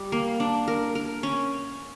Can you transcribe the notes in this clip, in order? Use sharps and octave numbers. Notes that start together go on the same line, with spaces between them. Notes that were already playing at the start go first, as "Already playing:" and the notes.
Already playing: G3
A#3
D4
A#4
A#4
C#4